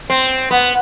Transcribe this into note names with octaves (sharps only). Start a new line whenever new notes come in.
C4
B3